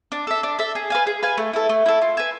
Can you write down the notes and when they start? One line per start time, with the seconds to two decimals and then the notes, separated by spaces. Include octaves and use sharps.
0.12 D4
0.27 A4 E5
0.43 D4
0.59 A4 E5
0.75 G#4
0.90 B4 F5 G#5
1.07 G#4
1.23 B4 F5 G#5
1.38 A3
1.53 E4 A4
1.69 A3
1.86 E4 A4
2.02 F4
2.17 B4 E5 G#5